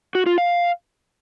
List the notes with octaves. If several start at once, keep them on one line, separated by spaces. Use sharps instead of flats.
F#4
F4
F5